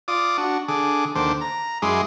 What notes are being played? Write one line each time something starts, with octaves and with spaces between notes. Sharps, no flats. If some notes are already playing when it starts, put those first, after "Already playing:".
F4 D5 D6 D#6
D4 F#4
D3 G#4 D6
D#2 D3 C5 D6
A#5
F#2 G#3 E4 G#4 C6 D6